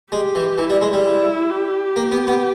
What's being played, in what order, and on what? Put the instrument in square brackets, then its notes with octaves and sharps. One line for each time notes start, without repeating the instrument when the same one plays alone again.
[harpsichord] G#3 [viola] G4
[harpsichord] E3
[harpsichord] E3 [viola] E4
[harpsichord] G3
G#3
G3
[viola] E4
G4
[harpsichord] A#3
B3
B3